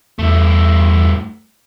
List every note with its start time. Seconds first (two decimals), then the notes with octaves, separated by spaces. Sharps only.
0.19 E2 G2 A3